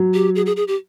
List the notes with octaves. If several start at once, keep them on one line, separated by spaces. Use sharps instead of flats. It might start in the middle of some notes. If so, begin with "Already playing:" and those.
Already playing: F#3
G4
G#4
G#4
G#4
G4